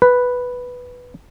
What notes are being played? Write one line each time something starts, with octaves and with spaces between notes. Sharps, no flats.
B4